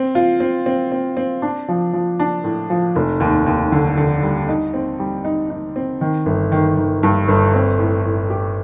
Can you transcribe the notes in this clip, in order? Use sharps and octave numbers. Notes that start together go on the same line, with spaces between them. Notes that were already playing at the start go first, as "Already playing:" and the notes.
Already playing: C4
F4
C4
C4
C4
C4
D4
F3
F3
D4
A2
F3
F1
D#2
D#2
D3
D3
G3
D#4
C4
G3
D#4
D#4
C4
D#3
G1
D#3
D#3
G2
G1
C4
A2
A2
G4